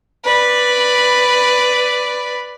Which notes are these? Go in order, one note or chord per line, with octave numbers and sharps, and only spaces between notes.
B4 D5